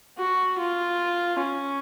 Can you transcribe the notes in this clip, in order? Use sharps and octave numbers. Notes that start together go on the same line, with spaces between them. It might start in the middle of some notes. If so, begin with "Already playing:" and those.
F#4
F4
C#4